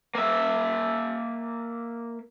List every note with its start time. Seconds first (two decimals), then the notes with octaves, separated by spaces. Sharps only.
0.15 A#3 E5